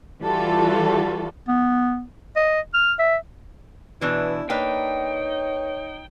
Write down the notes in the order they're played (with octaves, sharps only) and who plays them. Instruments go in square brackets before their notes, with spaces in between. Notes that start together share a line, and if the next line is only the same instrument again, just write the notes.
[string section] E3 G3 F4 F#4 A4
[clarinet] B3
D#5
F6
E5
[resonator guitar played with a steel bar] B2 E3 D4 [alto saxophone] E4 [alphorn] B4
[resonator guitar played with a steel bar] A#3 D4 B4 [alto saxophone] D#4 [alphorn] C#5 [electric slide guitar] G5